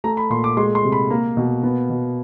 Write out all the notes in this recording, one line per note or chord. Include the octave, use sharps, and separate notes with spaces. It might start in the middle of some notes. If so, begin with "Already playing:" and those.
A3 A#5
B5
A#2 C6
D6
G#3 C6
C6
C3
B5
A#3 A#5
B2
B3
B2